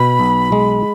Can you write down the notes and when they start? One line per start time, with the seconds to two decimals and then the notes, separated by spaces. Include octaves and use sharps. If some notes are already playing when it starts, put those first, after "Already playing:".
Already playing: B2 B5
0.20 B1
0.52 G#3